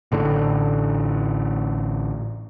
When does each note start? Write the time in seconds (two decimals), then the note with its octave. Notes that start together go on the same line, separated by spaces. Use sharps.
0.12 A1 A2 D3